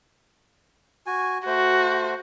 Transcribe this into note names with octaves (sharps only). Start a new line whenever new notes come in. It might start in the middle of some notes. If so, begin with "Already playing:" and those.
F#4 G#5
A3 F#4 C5